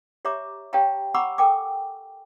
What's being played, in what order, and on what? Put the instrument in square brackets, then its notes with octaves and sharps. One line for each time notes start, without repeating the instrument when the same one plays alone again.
[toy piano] G4 C#5 E5 A#5 D6
G4 C#5 F5 G5 A5 A#5
F#5 A#5 B5 C#6 D6 E6
A4 A#4 G5 G#5 D6